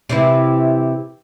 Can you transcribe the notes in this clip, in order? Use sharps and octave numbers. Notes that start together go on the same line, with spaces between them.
C3 E3 E4